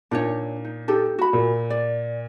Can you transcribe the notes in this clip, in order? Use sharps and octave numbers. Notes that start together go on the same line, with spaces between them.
A#2 D4 D#4 C#5
D#4
D#4 G4 A4
F#4 B5
A#2
D5